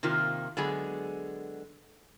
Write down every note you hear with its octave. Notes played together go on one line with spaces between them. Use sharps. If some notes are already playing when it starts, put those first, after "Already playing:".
C3 D#3 A#3 F4
D3 F#3 G#3 B3 G#4